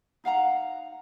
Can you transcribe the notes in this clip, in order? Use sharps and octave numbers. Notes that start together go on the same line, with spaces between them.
D#4 F5 F#5 A#5